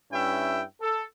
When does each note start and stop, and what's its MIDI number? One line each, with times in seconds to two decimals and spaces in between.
0.11 0.63 43
0.11 0.63 61
0.11 0.63 64
0.11 0.63 76
0.11 0.63 79
0.81 1.04 69